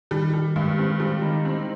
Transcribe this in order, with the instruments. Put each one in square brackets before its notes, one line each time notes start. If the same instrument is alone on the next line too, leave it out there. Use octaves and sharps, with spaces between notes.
[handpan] D#3 D#4 [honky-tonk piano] G3
[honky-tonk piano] G3
[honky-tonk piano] G2 [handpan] G#3
[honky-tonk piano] C4
G3
D#3
C4